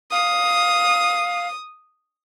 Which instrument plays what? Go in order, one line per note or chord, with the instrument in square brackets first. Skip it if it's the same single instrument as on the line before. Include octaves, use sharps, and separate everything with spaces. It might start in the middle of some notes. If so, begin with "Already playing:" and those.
[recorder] F5 [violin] D#6